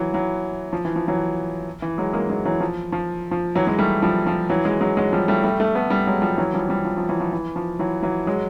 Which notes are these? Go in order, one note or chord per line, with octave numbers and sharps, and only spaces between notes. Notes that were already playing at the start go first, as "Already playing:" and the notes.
Already playing: E3 F#3
E3 F#3
F3
E3
F3
E3 F#3
E3
F#3 G#3
G#3 A#3
F#3 G#3
E3 F#3
F3
F3
F3
E3 F#3
F#3 G#3
G3 A3
F3 G3
F3
E3 F#3
F#3 G#3
F#3 G#3
F#3 G#3
F3 G3
G3 A3
G3 A3
G3 A3
A3 B3
G3 A3
F#3 G#3
F3 G3
E3 F#3
F3 G3
F3 G3
F3
F3
E3 F#3
F3
E3
F3
E3 F#3
E3 F#3
F#3 G#3